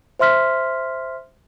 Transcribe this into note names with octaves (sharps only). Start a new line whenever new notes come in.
C5 E5 C6 F6 B6